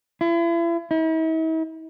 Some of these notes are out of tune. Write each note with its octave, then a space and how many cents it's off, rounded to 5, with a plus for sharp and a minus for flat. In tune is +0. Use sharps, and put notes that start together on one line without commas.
E4 +40
E4 -45